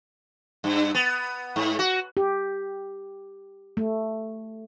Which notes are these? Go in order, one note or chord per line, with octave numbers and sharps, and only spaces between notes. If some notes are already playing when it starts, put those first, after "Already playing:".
G2
B3
G#2
F#4
G4
A3